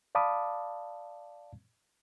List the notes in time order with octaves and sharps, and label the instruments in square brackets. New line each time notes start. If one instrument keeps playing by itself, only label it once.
[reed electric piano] D5 F5 A5 B5 D6 D#6